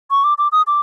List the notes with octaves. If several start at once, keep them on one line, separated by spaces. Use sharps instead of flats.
C#6
D6
D6
D#6
D6